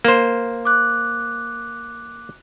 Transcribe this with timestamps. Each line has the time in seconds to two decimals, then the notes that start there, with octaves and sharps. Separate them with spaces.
0.05 A#3 C5
0.65 D6 F#6